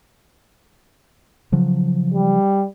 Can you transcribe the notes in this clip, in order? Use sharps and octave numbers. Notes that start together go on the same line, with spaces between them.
C#3 F3 F#3
G3